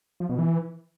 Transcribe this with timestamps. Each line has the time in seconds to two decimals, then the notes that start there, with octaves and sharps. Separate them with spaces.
0.20 F3
0.29 B2
0.38 E3